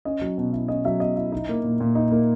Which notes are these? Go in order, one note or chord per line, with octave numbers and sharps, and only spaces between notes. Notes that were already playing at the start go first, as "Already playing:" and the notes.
C#4 D#5
F#3
B2
E4
C#4 D#5
F#3 E5
B2 D#5
E4
D#4
A#3
A#2
A#2
D#4
A#3